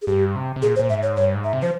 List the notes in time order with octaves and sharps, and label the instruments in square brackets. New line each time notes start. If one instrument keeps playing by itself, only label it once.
[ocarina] G#4
[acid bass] G2 [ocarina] G4
[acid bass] C3
C3
[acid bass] A#2 [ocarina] G#4
[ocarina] C5
[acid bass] A#2
[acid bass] G#2 [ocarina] E5
[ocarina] C#5
[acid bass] G2 [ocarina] C#5
[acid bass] G#2
[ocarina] E5
[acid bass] C3
[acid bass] F3 [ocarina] C5